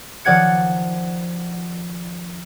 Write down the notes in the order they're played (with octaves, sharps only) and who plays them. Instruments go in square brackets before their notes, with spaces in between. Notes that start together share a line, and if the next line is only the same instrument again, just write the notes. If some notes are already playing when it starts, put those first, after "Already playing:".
[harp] D#3 F3 D5 F#5 G#6 C#7